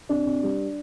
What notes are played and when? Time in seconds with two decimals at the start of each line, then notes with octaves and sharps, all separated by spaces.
0.09 C3 D4
0.26 C3
0.43 G3